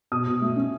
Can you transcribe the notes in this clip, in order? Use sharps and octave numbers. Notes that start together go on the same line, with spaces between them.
B2 D#6
B2
A3
C#4